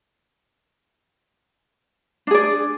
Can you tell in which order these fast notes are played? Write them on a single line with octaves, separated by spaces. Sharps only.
D4 G#4 D5